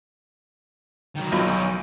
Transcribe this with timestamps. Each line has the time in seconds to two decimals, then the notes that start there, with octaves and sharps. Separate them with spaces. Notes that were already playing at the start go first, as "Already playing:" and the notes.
1.16 D#3 F#3
1.32 B1